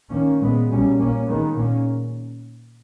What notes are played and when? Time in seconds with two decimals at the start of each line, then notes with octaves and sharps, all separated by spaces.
0.10 D#3 A#3 C#4
0.39 A#2 G#3 B3
0.68 B2 G3 A#3 C#4
0.97 A#2 A#3 C#4
1.26 D#3 G#3 B3
1.55 A#2 A#3 C#4